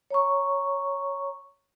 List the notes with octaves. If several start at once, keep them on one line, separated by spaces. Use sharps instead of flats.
C#5 A#5 C#6